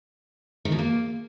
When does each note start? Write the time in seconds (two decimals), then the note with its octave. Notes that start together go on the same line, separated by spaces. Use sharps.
0.65 D#3
0.72 B2
0.79 A#3